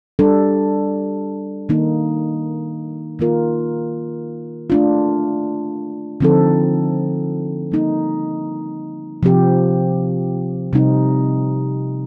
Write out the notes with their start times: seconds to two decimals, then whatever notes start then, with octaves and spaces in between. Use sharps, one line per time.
0.19 G3 D4 A4
1.69 D#3 A#3 D#4
3.19 D#3 A#3 F4 A#4
4.70 A3 D4 F4
6.21 D3 F3 C4 D#4 A4
7.72 G3 A#3 D#4
9.23 C3 F3 C4 G4
10.73 C3 G3 C4 D#4